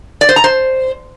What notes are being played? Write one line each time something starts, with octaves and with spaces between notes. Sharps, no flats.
D5
C5
A#5
C5